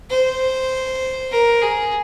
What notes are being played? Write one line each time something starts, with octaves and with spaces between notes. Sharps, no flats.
C5
A#4
G#4